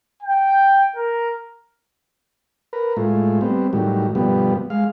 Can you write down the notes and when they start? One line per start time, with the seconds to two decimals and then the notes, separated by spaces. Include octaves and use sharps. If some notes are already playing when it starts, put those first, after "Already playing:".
0.23 G5
0.96 A#4
2.73 A#4 B4
2.97 A2 G#3 A3 F4
3.41 G3 B3 C4
3.73 A2 D#3 F#3 G3
4.15 G2 B2 F3 G3 B3
4.70 G#3 F5